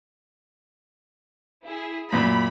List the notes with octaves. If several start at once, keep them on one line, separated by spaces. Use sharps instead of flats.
E4 G#4
F#2 A#2 B5